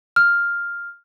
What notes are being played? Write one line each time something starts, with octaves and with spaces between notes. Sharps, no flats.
F6